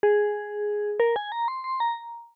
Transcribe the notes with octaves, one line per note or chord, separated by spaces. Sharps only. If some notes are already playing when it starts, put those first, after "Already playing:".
G#4
A#4
G#5
A#5
C6
C6
A#5